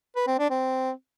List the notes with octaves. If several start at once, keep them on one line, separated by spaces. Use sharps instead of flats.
B4
C4
D4
C4